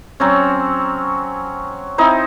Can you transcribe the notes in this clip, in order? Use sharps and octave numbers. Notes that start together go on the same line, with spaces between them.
F#3 C4 C#4
C4 D#4 E4 C5